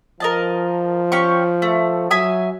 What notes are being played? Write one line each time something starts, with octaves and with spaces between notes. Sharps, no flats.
F3 A#4 D#5 A5
C#4 G4 C#6
A3
F#3 E5 G#5 D#6